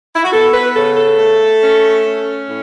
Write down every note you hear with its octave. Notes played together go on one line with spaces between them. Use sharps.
E4
F#4
B3 A4
B4
C#3 A4
A4
A3
C#4
C#4
A2